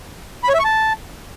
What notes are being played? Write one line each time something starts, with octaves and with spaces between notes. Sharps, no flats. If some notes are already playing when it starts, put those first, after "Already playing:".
B5
C#5
E5
C#6
A5